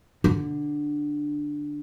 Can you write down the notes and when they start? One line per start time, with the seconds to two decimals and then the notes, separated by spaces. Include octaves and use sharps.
0.24 D3